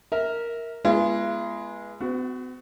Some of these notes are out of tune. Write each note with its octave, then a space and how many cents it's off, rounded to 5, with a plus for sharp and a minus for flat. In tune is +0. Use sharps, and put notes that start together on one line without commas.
A#4 +0 E5 -25
G#3 +0 B3 -30 F4 -45
B3 +45 F#4 +5